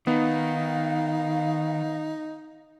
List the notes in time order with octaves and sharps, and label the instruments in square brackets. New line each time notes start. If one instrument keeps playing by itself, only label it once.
[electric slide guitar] D#3 [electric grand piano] B3 [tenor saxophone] D#4 [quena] F5